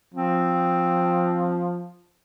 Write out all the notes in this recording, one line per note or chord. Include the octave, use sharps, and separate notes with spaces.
F3 C4